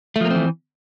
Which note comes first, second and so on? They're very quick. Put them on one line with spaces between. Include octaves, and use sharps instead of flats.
A3 F3 A#3 C4 E3